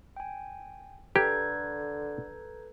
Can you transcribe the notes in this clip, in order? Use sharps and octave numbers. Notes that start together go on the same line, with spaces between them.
G5 G#5
D3 G4 A4 B4 A#5 G6 G#6